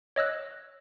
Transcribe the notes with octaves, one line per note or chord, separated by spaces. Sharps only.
C#5 D#5 E6 F#6